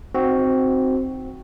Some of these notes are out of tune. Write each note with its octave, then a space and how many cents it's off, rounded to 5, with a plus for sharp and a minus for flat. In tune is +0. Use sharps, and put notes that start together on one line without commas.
C4 +0 D#4 -5 F#4 +0